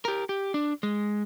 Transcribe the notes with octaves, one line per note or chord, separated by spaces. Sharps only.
G4 A#4
G4
D4
G#3